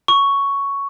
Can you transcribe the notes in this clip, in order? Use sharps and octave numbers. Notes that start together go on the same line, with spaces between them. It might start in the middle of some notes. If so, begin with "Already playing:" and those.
C#6